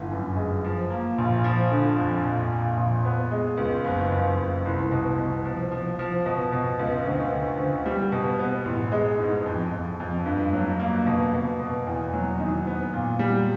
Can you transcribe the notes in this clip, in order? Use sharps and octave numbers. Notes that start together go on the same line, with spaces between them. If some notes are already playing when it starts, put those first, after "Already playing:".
Already playing: G1 A2
F#2
G#3
F3
A#3
A#1
F3
D3
F2
A#1
A#2
A#1
B3
G#3
C#2
F#1
F#1
F#1
C2
B2
B2
F3
F3
F3
B2
B2
C#2
D2
D2
D2
G3
B2
B3
A1
G#3
G#2
F2
F2
F2
G2
F#3
A#3
B2
B2
B2
E2
F#3
D#3
B3
A#2
G3